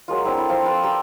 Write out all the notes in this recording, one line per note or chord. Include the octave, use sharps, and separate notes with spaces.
F#3 G#3 A#3 F4
C4 D4 E4 F5
E4 A4
F3 F5 A5
F4 A4 B4
G4 D5 A#5 E6